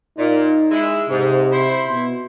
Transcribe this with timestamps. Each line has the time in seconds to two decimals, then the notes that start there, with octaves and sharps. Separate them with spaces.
0.18 A#2 D#4
0.71 G#3 E4
1.09 G#2 C3
1.51 E4 C5
1.88 B2